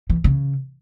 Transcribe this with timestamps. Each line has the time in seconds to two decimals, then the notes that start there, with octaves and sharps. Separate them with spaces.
0.10 E3
0.24 C#3